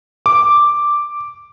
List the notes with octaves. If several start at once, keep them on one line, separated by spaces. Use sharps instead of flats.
D6